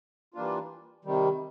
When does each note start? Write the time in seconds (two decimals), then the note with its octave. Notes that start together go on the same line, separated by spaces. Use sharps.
0.34 E3 G3 A#3 D4 F4
1.05 C3 D#3 G3